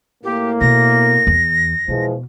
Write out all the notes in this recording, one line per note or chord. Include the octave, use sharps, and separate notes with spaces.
A2 A#3 G4
B2 A#6
E2
B2 E3 F3 G#3